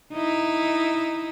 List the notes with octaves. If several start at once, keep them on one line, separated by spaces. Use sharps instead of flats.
D#4 E4